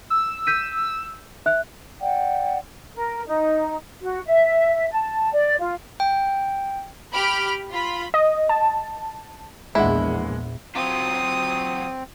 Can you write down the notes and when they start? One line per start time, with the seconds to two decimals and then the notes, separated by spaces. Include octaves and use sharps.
0.10 E6
0.47 G6 B6 D#7
1.46 E5 F#6
2.01 D5 F#5 G5
2.94 A#4
3.26 D#4
4.01 F#4
4.26 E5
4.91 A5
5.32 D5
5.59 F4
6.00 G5
7.13 G4 B5 F6 D7
7.72 F4 B5
8.14 D#5
8.49 A5
9.75 A#1 E2 G#3 D4 E4 F#5
10.75 F#3 C4 F4 D#6